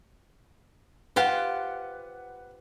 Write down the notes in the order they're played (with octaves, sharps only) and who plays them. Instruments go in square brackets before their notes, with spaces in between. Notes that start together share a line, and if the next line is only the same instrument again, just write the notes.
[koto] F4 G4 C5 [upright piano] B4 F#5